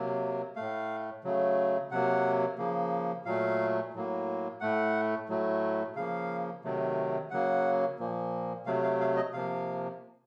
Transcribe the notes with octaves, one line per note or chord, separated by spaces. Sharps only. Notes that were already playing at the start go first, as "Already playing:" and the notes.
Already playing: C3 F#3 A#3
A2 A3 F5
C#3 F#3 A3
C3 F#3 A#3 F#5
C#3 F3 A#3
A#2 F#3 A3 F5
A2 F#3 A#3
A2 A3 F#5
A2 F#3 A3
C#3 F3 A#3 F5
C3 D#3 F#3 A3
C#3 F#3 A#3 F#5
A#2 F3 A#3
C3 F#3 A3 F5
F5
F5
D#5
C3 F3 A#3 F5